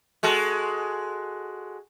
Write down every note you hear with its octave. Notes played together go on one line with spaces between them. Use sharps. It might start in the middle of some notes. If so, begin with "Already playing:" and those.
G#3 F#4 A4